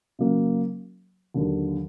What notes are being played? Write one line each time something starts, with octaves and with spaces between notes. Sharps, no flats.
C#3 F#3 A#3
D#2 D3 F#3